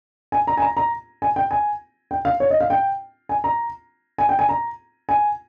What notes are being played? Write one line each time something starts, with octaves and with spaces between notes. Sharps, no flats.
G#5
A#5
G#5
A#5
A#5
G#5
G5
G#5
G5
F5
C#5
D#5
F5
G5
G#5
A#5
G#5
G5
G#5
A#5
G#5